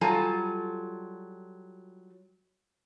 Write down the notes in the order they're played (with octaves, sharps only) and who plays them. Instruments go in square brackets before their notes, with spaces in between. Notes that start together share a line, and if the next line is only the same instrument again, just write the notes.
[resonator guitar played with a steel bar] F#3 G3 F4 A4 G#5 A#5